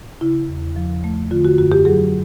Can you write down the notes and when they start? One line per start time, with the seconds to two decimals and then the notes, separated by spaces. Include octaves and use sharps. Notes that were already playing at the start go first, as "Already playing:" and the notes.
0.21 C#3 E4
0.48 E2
0.76 F3
1.04 A3
1.31 D3 F4
1.45 F#4
1.58 F#2 F#4
1.72 G4
1.85 F#3 G#4